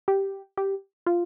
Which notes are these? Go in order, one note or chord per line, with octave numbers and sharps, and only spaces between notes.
G4
G4
F4